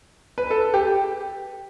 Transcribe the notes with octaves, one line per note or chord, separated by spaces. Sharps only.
B4
A4
G4